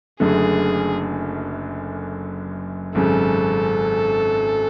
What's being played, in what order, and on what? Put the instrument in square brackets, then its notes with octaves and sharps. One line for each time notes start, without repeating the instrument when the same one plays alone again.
[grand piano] F#1 F#2 D3 A3 [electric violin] G#4
[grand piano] G#1 F#2 C#3 [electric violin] A4